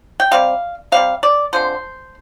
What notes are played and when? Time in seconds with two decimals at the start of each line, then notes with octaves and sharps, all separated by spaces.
0.20 G5
0.31 C3 G3 C4 F5
0.92 C3 G3 C4 F5
1.23 D5
1.53 D3 F3 G#3 C4 C5